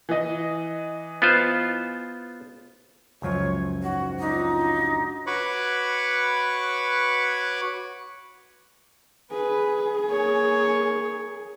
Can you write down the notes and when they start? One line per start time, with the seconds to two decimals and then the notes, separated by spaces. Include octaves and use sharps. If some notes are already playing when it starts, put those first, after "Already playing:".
0.09 E3 D#5
1.22 B3 F4 C5
3.22 C#2 F#2 F3 C#5
3.82 G#2 F#4
4.20 F#3 D4 D#4 F4
5.27 F#4 B4 C#5 B5 C#6 D6
9.31 G#4 B4
10.07 A#3 C#5